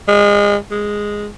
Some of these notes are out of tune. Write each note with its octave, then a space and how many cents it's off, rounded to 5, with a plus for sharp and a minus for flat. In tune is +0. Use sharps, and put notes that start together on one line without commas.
G#3 -30
G#3 -5